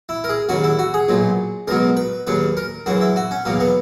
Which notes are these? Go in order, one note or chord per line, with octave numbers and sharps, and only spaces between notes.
E4
A#4
G#4
D#2 C#3 F#3 F#4
E4
F#4
G#4
B1 A#2 F#3
C#2 B2 F#3 A#4
B4
D#2 C#3 F#3 B4
A#4
F#2 C#3 E3 F#4
E4
F#4
C#4
E2 B2 F#3 A#3
B3